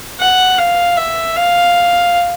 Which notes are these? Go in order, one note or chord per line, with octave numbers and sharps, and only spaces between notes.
F#5
F5
E5
F5